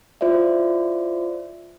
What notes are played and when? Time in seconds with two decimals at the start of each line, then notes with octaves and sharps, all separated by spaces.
0.21 E4 F4 C5 D5 E5